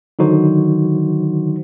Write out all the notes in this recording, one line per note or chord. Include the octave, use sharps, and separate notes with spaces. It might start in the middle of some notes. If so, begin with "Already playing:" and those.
D3 D#3 F#3 D#4 F#4 C5